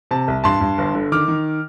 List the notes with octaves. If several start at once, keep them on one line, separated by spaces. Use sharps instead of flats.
C3 A5
C2
G2 A5 C6
G2
G1
D3
D#3 D6 F6
D#3